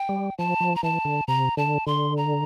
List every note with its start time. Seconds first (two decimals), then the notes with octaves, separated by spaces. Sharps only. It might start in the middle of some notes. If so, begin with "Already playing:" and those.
Already playing: G5
0.09 G3
0.38 F3 A5
0.60 F3
0.76 A#5
0.83 E3 A5
1.05 D3
1.28 C3 A#5
1.57 D3 A5
1.87 D3 C6
2.17 A#5